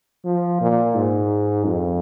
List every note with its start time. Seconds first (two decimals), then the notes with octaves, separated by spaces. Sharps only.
0.25 F3
0.61 A#2
0.95 G#2
1.66 F2